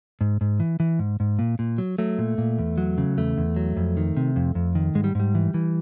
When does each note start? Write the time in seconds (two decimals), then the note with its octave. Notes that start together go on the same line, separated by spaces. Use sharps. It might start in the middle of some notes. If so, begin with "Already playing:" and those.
0.21 G#2
0.41 G#2
0.60 E3
0.80 E3
0.99 G#2
1.20 G#2
1.39 A#2
1.59 A#2
1.78 F#3
1.98 F#3 A3
2.18 A#2
2.38 A#2
2.59 E2
2.78 F#3
2.98 C#3
3.17 E2 A3
3.37 E2
3.56 F#3
3.77 F2
3.97 D#3
4.17 C3
4.36 F2
4.55 F2
4.75 D#3
4.95 G#2 G#3
5.04 G3
5.15 G#2 G3
5.35 E3
5.54 E3